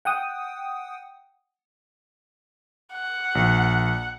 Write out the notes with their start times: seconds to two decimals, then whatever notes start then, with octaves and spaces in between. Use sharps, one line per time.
0.05 F#5 G5 D#6
2.94 F#5
3.35 A#1